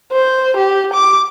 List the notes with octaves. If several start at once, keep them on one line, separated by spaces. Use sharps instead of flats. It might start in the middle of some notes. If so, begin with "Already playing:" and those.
C5
G4
D6